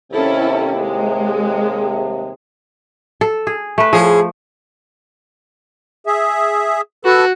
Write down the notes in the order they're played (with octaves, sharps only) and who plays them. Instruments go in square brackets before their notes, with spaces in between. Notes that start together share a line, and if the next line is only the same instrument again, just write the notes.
[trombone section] D#2 C3 [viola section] C#4 E4 A4
[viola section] G#3
[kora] A4
G#4
A3 B4
[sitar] A2 G#4 [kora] F3
[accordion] G#4 E5
[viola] F#4 [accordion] A4 B4